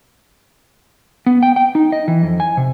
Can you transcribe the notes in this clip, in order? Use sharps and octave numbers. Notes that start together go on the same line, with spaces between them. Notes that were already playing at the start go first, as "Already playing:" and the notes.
B3
G5
G5
D#4
D#5
E3
F2
G#5
C3